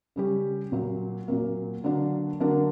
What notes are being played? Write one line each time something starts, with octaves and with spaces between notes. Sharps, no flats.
C#3 G3 C#4 G4
A#2 F#3 A#3
A#2 F#3 A#3
D3 F#3 A#3 D4 A#4
D3 F#3 A#3 D4 A#4